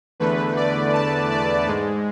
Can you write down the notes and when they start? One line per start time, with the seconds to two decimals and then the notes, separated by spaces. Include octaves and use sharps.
0.20 E2 D3 A3 B4
0.56 D5
0.93 A5
1.30 D5
1.66 G#2 G#3